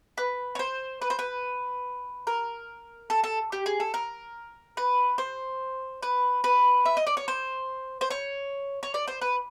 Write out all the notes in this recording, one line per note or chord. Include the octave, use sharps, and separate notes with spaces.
B4
C#5
C5
B4
C5
B4
A#4
A4
A4
G4
G#4
A4
A#4
B4
C5
B4
B4
E5
D#5
D5
C#5
C5
C5
C#5
C#5
D5
C5
B4